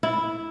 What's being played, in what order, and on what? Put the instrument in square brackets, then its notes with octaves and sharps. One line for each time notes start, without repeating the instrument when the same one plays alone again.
[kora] E4